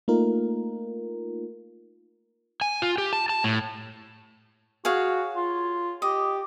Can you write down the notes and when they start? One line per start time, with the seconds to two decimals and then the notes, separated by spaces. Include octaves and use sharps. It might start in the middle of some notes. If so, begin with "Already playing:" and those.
0.08 A3 A#3 D#4 F4 A#4
2.61 G#5
2.82 F4
2.98 G4
3.13 A5
3.29 A5
3.44 A2
4.85 F#4 G#4 C#5 F5
5.36 F4
6.02 G4 D#5